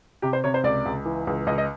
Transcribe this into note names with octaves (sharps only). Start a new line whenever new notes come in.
C3 G4
C5
C3 C#5
C5
C#2 D5
C#2
E3
C#2
C#2 D#5
D#5